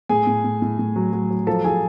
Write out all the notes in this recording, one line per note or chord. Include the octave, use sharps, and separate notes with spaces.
A2 G#4 G#5
A2
A2
A2
A2
F#3
F#3
F#3
F3 A4 A5
F3 G#4 G#5